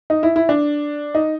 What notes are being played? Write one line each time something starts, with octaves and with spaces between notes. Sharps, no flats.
D#4
E4
E4
D4
D#4